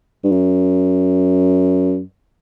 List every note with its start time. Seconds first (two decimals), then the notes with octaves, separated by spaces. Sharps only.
0.24 G2
0.32 F#2